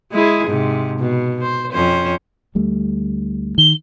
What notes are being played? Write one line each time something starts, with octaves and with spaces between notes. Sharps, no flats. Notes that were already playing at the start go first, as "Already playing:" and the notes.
G#3 E4 G#4
G#2 C3
B2
C5
F2 C#4 C5
D2 G3 A3
D#3 G7